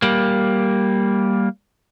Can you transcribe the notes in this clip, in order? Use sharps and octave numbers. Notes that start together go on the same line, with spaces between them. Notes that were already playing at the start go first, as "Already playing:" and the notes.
G3 A#3